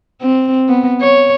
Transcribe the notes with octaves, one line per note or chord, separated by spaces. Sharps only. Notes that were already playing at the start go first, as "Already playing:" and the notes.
C4
B3
C#5